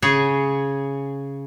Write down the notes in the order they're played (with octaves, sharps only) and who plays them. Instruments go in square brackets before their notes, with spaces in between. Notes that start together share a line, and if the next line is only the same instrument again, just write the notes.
[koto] C#3 G#4 C#5